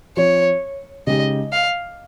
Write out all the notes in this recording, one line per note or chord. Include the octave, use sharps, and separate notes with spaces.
F3 C4 F4 C#5
C#3 G#3 D#4 G4 D#5
F5